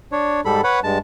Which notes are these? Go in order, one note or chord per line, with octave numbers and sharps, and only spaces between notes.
D4 C#5
G#2 G3 A4 B5
B4 C#5 F#5 B5
G2 G#3 A5